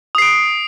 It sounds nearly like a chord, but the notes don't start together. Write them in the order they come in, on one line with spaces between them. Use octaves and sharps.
D#6 C7 D7